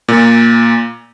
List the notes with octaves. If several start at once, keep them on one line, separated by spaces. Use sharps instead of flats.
A#2